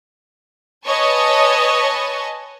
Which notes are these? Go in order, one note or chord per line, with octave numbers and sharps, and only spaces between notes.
B4 C#5 D#5 G#5 A5 C#6